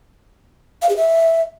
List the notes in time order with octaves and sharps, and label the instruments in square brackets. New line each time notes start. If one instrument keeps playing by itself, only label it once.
[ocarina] F5
G#4
E5